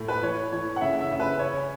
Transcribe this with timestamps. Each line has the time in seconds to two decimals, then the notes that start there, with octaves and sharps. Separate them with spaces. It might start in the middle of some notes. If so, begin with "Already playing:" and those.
Already playing: A2
0.08 B4
0.23 E3 C#5
0.52 E3 C#5
0.76 F#5
0.81 C#3 E5
1.00 E5
1.11 C#3
1.20 B4
1.39 C#4 C#5